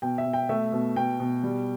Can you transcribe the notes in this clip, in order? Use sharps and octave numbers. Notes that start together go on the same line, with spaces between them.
B2 G5
E5
B2
G5
A3 E5
B2
B2 G5
B2
G3